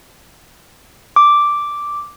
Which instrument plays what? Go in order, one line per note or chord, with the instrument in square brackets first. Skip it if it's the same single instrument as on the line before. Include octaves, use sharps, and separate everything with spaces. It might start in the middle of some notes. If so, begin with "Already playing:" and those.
[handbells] D6